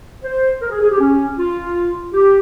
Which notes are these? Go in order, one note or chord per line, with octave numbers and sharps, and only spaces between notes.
C5
A#4
G#4
G#4
G4
C#4
F4
G4